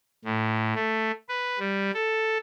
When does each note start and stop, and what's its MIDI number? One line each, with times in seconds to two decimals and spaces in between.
0.25 0.74 45
0.75 1.11 57
1.29 1.59 71
1.59 1.91 55
1.94 2.37 69